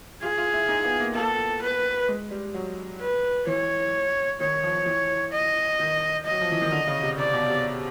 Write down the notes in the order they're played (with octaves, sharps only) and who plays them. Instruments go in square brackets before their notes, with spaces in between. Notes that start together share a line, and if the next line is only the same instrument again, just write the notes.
[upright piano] F4 [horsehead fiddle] G#4
[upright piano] F4
E4
D#4
B3
A#3
[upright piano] A#3 [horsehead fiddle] A4
[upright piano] B3
A#3
[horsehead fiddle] B4
[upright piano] G#3
G3
F#3
[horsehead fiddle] B4
[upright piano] E3 [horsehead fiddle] C#5
[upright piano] D#3 [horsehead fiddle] C#5
[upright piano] F3
E3
[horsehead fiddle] D#5
[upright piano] D#3
[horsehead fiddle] D#5
[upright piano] F#3
F3
E3
D#3
D3
C#3
C3
[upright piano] C3 [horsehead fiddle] D5
[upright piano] B2
C3